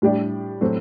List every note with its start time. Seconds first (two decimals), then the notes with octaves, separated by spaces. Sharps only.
0.02 A2 G3 D4 G4 D5
0.61 A2 F#3 C4 F#4 A4